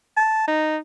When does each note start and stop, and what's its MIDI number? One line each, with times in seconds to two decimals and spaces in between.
0.17 0.46 81
0.47 0.77 63